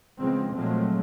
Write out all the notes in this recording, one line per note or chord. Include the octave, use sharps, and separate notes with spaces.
C#3 F3 G#3 B3 C4
A#2 F3 F#3 G#3 A3 C4